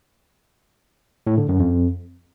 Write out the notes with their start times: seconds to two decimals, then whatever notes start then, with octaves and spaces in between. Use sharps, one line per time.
1.27 A2
1.38 D3
1.49 F#2
1.60 F2